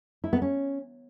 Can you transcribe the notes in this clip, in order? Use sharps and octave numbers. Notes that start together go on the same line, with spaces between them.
E4
B3
C#4